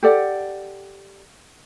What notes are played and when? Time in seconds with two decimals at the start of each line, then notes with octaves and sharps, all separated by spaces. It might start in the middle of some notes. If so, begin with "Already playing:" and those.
0.03 G4 A4 D5 F#5